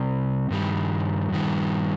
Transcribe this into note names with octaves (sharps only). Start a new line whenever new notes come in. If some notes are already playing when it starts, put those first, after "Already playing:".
Already playing: C3 G3 C4
G2 D#3 G3
G2 D#3 G3